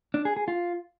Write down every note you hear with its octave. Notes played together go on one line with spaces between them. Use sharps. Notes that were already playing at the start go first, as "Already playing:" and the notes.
D4
G#4
G#4
F4